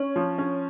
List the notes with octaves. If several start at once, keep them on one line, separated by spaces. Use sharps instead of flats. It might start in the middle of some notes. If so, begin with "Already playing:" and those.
Already playing: C#4 C#5
F3
C#4